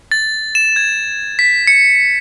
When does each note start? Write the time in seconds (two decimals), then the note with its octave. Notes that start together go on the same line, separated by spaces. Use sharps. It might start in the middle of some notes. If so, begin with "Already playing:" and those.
0.12 A6
0.55 E7
0.76 G#6
1.39 B6
1.67 C#7